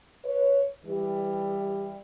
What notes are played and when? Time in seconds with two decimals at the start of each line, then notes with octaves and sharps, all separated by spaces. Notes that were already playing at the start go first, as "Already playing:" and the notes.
0.25 B4 C#5
0.85 E3 G3